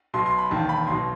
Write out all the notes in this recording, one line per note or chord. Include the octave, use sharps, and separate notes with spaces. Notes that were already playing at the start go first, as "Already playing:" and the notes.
B1 B2 C6
C6
B5
E1 D#2 D#3 A5
B5
B1 B2 C6